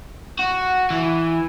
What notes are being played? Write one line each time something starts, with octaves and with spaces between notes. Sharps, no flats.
F#4
E3